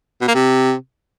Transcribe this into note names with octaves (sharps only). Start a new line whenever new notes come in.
B2
A#3
C3